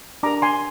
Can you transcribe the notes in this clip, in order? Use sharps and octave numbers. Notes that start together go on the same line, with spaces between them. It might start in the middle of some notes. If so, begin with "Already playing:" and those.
D4 G4 A#4 A#5 D6
G#5 C6